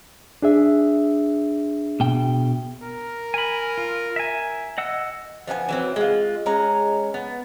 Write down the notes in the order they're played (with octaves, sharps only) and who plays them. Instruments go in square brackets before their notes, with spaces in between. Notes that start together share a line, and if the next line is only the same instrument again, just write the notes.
[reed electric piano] D4 G#4 E5
[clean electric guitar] B2 G5
[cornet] A#4
[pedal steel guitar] G#5 B5
F4
E5 G#5
D#5 F#5 E6
[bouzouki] F3 B3 D#5 G#5
E3 F#3 C4
G#3 F4
G#3 C#4 A#5
B3